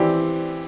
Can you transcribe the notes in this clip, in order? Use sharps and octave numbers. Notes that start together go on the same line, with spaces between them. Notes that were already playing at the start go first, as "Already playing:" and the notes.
Already playing: E3 C4 G4 D5